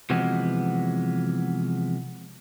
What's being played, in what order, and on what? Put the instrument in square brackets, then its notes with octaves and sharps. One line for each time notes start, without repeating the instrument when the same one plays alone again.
[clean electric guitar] C3 E3 F3 G#3 B3 F#4